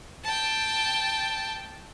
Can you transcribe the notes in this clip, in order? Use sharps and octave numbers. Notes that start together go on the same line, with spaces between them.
G5 A5